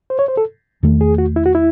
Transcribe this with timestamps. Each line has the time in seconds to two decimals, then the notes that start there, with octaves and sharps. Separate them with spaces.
0.10 C5
0.19 C#5
0.28 C5
0.37 A4
0.83 E2 D#3 A3
1.01 G#4
1.18 F#4
1.36 E4
1.46 F#4
1.55 E4